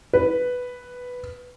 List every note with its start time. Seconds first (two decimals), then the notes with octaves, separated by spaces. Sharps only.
0.13 B4